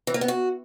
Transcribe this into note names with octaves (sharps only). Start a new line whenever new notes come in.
E3
A#3
B3
F#4